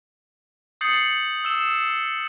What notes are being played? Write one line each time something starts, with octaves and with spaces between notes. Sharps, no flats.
D#6 G6 A6 C7 C#7 F#7
E6 E7